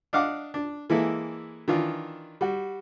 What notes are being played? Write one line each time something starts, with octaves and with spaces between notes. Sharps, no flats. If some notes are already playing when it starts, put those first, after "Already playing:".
D4 D#5 F5 F#5 D6
D4
E3 G#3 A#3 E4 A4
D#3 E3 D4 F4
G3 F#4